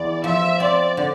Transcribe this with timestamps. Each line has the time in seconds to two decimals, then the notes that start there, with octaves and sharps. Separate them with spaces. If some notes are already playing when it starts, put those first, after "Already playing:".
Already playing: E2 E3 D5
0.24 F3 E5
0.60 C4 D5
0.97 D3